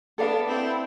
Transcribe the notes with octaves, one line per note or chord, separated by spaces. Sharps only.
B3 D4 A4 D5 F5
C4 E4